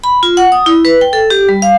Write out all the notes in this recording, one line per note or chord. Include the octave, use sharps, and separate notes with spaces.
B5
F4
F#5
D#6
E4
B4
G5
A4
G4
G3
F5